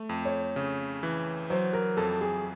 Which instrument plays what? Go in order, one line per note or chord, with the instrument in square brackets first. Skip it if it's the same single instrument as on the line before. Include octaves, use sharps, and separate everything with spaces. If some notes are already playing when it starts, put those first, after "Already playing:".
Already playing: [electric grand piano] A3
F2
[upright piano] C#5
[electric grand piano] C#3
E3
[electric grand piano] F#3 [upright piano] C5
[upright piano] A#4
[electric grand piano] F2 [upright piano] A4
[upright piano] G#4